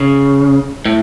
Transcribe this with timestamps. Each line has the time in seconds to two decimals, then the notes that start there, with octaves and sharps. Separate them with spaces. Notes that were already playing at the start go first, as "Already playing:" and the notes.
Already playing: C#3
0.85 A2